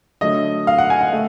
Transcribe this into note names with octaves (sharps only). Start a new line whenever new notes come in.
D3 F#3 A3 D#5
F5
F#5
G#5
F#5
A3